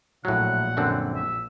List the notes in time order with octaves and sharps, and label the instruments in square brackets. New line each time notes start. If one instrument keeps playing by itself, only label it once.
[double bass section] A#1 [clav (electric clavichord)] A2 F#3 [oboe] F#5
[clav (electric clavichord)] F#2 D3 C4
[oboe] E5